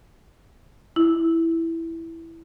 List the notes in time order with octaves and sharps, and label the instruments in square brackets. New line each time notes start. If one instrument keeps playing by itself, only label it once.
[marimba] E4